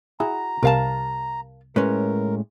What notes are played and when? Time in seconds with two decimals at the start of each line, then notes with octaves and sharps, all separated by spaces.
0.20 E4 F#4 G#4 A#5
0.63 C2 C3 A#4 F5 A5
1.76 A2 G#3 C#4 A#4 B4